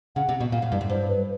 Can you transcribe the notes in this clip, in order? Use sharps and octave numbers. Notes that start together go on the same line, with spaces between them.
C#3 F#5
C3
B2
A#2 F5
A2
G2
F#2
G2 C5
B4